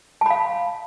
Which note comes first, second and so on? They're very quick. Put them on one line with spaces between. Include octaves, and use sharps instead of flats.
A5 B5 F5